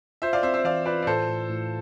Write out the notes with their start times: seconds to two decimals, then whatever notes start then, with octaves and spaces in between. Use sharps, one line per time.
0.22 F4 C5 E5
0.33 D5 F5
0.43 C4 C5 E5
0.54 C5 E5
0.65 E3 D5 F5
0.85 F4 B4 D5
1.03 D5
1.07 A2 A4 C5
1.29 A2
1.49 A2